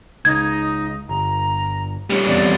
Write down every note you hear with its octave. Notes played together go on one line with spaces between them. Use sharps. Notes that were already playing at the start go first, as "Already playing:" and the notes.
C#2 D#4 G#6
G1 A#5
G3 C#4
F1 E2 C3 D5